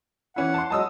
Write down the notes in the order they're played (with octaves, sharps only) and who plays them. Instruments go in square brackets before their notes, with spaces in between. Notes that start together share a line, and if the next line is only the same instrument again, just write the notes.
[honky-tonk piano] E3 C#4 E4 [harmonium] F#5
[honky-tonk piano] A5 C6
[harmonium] F#3 G#3 [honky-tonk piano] A5 D#6 E6